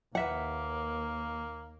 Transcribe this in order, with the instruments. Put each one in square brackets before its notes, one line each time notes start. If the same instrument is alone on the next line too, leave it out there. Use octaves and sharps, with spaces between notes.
[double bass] D#2 [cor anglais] A#3 [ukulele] B4 E5 F#5